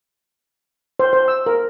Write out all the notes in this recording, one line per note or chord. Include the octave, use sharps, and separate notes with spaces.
C5
C5
E6
A#4